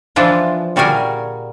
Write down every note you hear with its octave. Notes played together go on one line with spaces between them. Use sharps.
E3 F3 D4 F4
A#2 G3 F#4 G#4 A#4 G#5